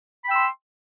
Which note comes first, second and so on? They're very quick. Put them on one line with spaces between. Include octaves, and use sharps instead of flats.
B5 G5 E6 C6